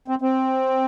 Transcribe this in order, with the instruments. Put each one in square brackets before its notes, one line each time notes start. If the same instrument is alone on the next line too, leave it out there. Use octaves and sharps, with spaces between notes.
[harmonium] C4
C4